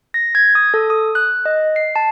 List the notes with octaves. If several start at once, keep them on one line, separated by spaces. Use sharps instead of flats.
A#6
G#6
D#6
A4
D#6
F#6
D#5
C7
A5